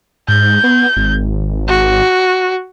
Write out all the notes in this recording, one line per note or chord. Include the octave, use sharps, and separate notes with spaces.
G#2 G6
B3
G#1
F#4